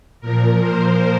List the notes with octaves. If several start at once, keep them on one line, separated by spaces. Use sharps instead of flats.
A#2 F3 A#4
C5